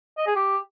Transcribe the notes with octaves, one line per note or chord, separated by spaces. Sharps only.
D#5
G#4
G4